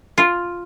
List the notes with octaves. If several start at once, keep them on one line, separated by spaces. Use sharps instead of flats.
F4